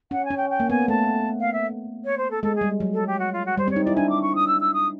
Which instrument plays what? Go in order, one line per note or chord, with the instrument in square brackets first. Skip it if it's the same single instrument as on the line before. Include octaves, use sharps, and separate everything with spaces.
[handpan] C#4 [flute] F#5
[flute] G#5
[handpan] C#4
[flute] G5
G5
[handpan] A#3
[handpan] B3 [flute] G#5
[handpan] A3 [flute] A5
[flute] F5
E5
C#5
C5
A4
[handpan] G#3 [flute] A4
[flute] G#4
[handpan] G3
F#3
[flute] A4
G4
F#4
F4
F#4
[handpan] G3 [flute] C5
[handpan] C4 [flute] C#5
[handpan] D#4
[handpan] E4 [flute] D5
[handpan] D4 [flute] G#5
[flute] D6
C#6
D#6
E6
E6
D#6